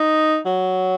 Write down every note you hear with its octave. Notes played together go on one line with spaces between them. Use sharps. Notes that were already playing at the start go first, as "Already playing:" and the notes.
Already playing: D#4
F#3